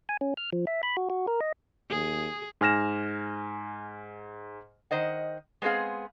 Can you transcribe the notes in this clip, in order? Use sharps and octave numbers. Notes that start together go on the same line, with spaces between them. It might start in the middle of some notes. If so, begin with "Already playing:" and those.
G#5
C#4
F6
F3
E5
B5
F#4
F#4
A#4
D#5
D#2 G#4
G#2 G#5 F6 A#6 E7
D#3 C5 D#5 F#5
G#3 B3 C4 G#4 F5